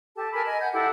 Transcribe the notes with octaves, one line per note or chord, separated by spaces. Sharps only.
G4 A4 A5
A#4 G#5 A5 B5
D#5 G#5
F#5 G6
E4 G4 A4 F#5